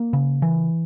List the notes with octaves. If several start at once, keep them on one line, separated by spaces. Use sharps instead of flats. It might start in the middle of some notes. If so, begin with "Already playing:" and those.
Already playing: A#3
C#3
E3